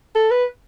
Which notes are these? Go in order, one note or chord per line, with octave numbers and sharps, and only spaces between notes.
A4
B4